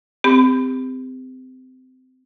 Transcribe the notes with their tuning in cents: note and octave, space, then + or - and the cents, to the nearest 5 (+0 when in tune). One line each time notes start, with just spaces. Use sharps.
C4 -25 G4 +35 B5 +30